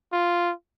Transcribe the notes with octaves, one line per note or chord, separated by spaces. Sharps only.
F4